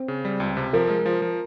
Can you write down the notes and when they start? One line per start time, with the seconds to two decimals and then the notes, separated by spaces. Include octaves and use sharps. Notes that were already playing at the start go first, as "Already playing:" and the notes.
Already playing: C4
0.08 C#3
0.25 G3
0.40 C#2
0.57 C3
0.73 F3 A#4
0.90 G#3
1.06 F3
1.22 F3